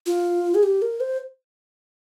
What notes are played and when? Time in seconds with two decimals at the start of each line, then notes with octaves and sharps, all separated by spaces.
0.06 F4
0.55 G#4
0.63 G4
0.82 A#4
1.00 C5